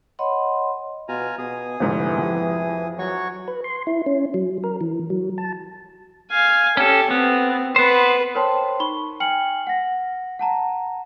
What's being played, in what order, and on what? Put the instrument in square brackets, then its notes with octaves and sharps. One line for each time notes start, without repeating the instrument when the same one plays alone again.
[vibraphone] C#5 D#5 F#5 B5 C6
[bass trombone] B2 [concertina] F4 G#5 A#5
[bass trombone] B2 [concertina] G#4 D#6
[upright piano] F1 G#2 D3 [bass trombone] E3
[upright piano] F2 G4
[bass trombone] F#3 [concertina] F#4 C#5 C#6
[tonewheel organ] B4
C6
E4
C#4
F#3
A#4
E3
F#3
A5
[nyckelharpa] F5 G#5
[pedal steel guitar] C#4 A4 [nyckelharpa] G4
[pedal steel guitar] B3 [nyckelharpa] C4
[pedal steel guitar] B3 C5 [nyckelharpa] B4
[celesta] A#4 C5 C#5 G5 A5 C6
D#4 B5 C#6 G7
G5 G#5 F6 C#7 F#7
F#5 A#6
F#5 A5 A#5